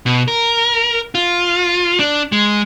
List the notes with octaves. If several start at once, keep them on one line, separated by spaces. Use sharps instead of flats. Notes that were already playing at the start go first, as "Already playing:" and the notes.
B2
A#4
F4
D4
G#3